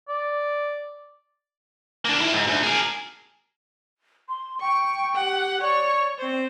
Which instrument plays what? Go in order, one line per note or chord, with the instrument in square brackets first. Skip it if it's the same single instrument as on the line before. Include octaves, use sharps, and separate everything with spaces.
[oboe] D5
[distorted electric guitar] A#3 D4
D#3 E4
G#2
D2
G#4 A#4
[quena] C6
[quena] G5 [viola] C#6
[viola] G4 F#5
[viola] C#5 C#6 [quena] D5
[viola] C4 C5